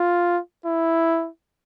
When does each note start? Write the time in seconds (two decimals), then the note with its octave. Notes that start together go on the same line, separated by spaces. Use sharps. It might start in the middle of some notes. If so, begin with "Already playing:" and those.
Already playing: F4
0.66 E4